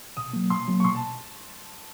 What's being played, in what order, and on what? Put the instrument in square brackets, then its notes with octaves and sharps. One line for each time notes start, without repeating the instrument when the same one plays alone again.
[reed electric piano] B2 [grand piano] D#6
[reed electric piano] F#3 A#3
[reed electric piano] B2 [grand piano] C6
[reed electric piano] F#3 A#3
[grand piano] C#6
[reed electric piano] B2 [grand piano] C6
[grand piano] A5